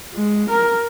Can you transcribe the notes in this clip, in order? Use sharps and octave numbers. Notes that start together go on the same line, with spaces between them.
G#3
A#4